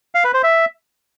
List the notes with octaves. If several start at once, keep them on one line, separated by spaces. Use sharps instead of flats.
F5
B4
C5
E5